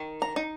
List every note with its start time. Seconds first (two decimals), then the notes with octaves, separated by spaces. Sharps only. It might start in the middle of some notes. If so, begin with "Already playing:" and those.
Already playing: D#3
0.22 A#5
0.36 D#4